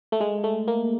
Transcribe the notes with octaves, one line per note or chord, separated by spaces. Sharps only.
A3
G#3
A3
A#3